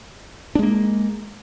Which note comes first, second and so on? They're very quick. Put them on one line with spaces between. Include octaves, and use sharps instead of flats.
D4 G#3 A#3